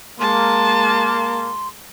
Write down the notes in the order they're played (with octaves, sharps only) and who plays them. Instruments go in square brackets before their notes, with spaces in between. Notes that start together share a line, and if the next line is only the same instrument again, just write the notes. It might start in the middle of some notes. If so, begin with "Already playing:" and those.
[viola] G#3 A5 [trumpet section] A#3 [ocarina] C6